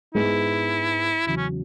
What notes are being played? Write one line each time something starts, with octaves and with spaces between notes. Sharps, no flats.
G#2 G#3 B3 E4 G#4
E2 C#3 F#3 E4
C#4